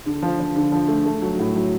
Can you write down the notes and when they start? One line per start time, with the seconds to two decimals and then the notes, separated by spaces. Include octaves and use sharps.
0.06 D3
0.23 F3
0.40 F3
0.55 D3
0.72 F3
0.88 A3
1.06 A3
1.22 F#3
1.39 A2
1.56 F#3